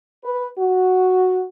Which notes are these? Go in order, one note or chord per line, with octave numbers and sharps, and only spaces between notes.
B4
F#4